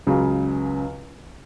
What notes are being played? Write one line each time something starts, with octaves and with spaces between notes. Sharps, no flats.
C#2 C#3 F#3